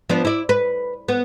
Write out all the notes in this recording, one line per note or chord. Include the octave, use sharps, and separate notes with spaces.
F3 B3 D4
E4 D5
B4
B3